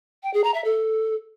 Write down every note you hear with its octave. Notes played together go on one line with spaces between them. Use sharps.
G5
G#4
A#5
E5
A4